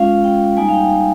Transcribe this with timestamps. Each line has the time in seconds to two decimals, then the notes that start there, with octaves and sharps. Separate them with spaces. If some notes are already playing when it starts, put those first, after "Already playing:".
Already playing: G#3 C#4 F4 F5
0.24 G5
0.57 G3 A#3 D#4 G#5
0.69 F5
0.73 G5
0.90 F5